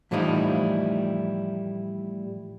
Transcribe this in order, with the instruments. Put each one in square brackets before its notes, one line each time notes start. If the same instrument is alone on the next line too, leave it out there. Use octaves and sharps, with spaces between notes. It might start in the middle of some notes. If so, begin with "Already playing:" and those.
[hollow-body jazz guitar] A2 E3 F3 G3 D#4 E4